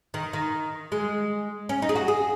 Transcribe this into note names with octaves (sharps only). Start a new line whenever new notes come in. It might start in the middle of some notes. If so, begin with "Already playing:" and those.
D#3
D#3
G#3
C#4
D#4
G#4
F#4
G#4